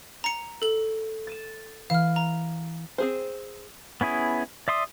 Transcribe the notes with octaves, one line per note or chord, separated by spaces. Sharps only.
A#5 C#7
A4 F#7
A6 D#7 E7
E3 F5 F6
A#5
C4 G#4 C5
B3 C#4 E4 G#4
D5 E5 C6 D#6